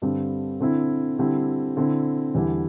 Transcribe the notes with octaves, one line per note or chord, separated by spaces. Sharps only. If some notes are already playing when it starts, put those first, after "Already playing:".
G2 D3 G3 C4
D3 C4 E4
D3 G3 C4 E4
D3 C4 E4
E2 D3 G3 E4